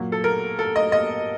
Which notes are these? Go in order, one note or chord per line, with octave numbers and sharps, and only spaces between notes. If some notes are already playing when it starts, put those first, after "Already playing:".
Already playing: A#2 F#3
A4
A#4
A4
D#5
D#5